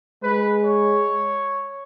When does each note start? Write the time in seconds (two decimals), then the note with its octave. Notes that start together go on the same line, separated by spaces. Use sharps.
0.23 G#3 B4
0.64 C#5